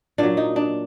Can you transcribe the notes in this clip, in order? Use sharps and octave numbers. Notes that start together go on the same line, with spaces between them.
A#2 F#3 D4
D#4
D4